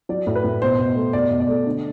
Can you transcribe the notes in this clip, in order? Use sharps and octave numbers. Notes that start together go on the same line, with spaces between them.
F#3 D5
A2
B4
A2
B2 C5
B2
A3
B2 D5
B2
D5
A3
D3